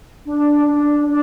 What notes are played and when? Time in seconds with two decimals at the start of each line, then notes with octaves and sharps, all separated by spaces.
0.25 D4
0.66 D4
1.06 D4